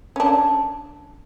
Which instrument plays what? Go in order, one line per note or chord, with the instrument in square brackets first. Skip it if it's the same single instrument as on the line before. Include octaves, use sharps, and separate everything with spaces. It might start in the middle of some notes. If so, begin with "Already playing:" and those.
[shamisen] C#4 D4